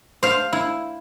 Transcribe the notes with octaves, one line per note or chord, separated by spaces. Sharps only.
C5 F5
E4